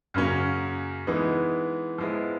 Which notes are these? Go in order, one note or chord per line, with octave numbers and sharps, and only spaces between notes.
F#2 C#3 F#3 A#3 C#4
E3 G#3 B3 D#4
F3 G#3 B3 E4